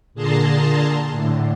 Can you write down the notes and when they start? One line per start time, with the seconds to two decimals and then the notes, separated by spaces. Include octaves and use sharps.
0.14 A#2 D3 G#4 A5 A#5 C6
1.10 A2 D3